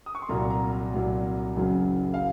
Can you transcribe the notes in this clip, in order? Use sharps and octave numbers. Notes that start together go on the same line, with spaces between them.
D#6
C#6
C6
C2 A#2 F#3 A#5
A#5
A#5
C2 A#2 F#3
F#1 F#2 C#3 F#3
F5